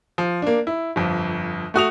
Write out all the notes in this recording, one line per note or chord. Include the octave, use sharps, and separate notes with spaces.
F3
A#3 D4
E4
G1 F2
A3 F#4 D#6 F7